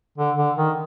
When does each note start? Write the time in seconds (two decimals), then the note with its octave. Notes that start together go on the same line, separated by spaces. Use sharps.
0.18 D3
0.37 D3
0.56 D#3